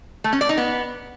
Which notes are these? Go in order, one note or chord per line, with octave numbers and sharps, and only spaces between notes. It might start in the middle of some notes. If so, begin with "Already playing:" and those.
A3
C#4
D5
D#4
B3